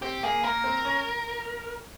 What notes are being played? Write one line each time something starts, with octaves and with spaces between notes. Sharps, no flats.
C4 G4
A#3 G#4
A#3 A#4
C4
C#4